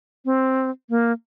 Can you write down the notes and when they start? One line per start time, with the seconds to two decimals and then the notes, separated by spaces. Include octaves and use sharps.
0.25 C4
0.90 A#3